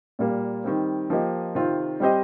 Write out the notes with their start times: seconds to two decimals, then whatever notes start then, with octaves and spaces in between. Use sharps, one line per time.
0.19 A#2 G3 A#3
0.64 D#3 G3 C4
1.10 F3 A#3 G4 D#5
1.55 C3 D#3 C4 F4
2.00 G3 C4 G4 C5 D#5